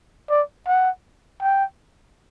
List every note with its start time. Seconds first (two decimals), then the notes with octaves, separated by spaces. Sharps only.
0.30 D5
0.67 F#5
1.42 G5